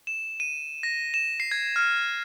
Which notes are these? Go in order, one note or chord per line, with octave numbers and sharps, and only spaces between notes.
E7
D#7
A#6
E7
C7
G#6
F6